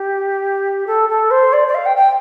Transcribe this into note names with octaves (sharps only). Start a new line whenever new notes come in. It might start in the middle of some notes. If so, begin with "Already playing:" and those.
Already playing: G4
A4
A4
C5
D5
D5
F5
G5
G5